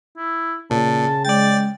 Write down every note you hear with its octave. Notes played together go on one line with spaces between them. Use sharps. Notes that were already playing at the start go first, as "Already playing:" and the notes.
E4
A#2 C#3 A5
G#3 D5 G5 A6